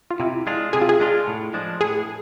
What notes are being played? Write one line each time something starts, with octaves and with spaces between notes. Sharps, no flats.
F4
C3 E4
G#3 D4 F4
C3 G#4
F4
G#4
G#3 D4 F4
A2
F3 G#3 D4
A2 G#4